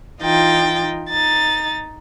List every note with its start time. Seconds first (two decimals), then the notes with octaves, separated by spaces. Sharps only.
0.20 E3 D#4 F4 G5 A6
1.10 D#4 A6